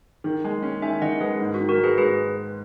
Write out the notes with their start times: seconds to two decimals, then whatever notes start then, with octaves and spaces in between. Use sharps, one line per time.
0.24 D#3
0.44 G#3
0.63 C#4
0.82 D#3 E5 G#5
1.02 D#3 D#5 F#5
1.21 G#3 G#4 B4
1.40 G#2 E4
1.54 F#4
1.59 D#3
1.69 F#4 A#4
1.78 G#3
1.84 G#4 B4
1.98 G#2 G#4 B4